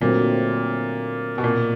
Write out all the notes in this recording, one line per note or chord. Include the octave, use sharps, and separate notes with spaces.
A#2 D3 F#3 A3 C4
B2
A#2